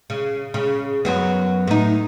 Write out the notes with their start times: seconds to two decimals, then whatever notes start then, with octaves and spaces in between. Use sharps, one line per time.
0.10 C#3
0.54 C#3
1.05 F#2 F#3 B3
1.67 A2 D#4